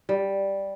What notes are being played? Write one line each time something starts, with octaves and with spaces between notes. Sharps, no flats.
G3